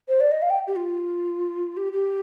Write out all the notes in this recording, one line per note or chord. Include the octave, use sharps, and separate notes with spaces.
C5
D5
D#5
F5
G5
G4
F4
G4
G4